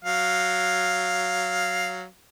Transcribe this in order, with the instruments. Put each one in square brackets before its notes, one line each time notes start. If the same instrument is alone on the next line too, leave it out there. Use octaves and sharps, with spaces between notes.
[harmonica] F#3 F5